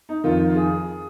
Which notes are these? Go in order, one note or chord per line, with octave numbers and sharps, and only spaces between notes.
D#4
F2 D#3 F4
F4
G#4